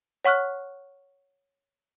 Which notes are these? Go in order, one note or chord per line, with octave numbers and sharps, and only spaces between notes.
C#5 F#5 C#6 F6 F#6